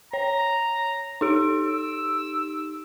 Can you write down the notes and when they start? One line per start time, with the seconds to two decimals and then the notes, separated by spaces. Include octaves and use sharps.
0.13 C#5 A#5
1.21 D#4 G4 D7
1.65 E6